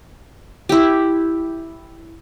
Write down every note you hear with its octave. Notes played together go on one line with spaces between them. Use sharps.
E4 G4